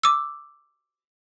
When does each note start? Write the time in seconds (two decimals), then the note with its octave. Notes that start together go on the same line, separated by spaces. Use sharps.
0.03 D6 E6